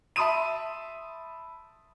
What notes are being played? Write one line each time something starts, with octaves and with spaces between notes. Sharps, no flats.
E5 A5 B5 C6 D#6 D#7